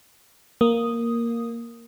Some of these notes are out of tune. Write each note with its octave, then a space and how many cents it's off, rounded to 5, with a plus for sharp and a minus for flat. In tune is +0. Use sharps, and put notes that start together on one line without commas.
A#3 +0 D#6 +0